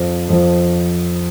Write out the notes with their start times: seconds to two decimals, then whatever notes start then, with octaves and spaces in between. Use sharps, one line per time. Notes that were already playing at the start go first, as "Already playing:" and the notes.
Already playing: F2 F3
0.29 F2 F3